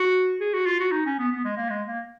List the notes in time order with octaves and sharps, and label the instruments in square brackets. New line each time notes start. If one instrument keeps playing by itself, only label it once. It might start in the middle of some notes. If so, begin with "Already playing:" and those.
Already playing: [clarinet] F#4
G#4
F#4
F4
F#4
D#4
C#4
B3
B3
G#3
A#3
G#3
A#3